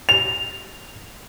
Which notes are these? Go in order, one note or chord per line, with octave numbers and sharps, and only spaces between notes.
F7